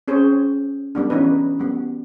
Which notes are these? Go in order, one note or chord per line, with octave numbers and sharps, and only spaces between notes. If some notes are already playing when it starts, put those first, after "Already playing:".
C4 C#4 G#4 C5 C#5
G3 B3 D4
E3 C#4 D#4 B4
G3 B3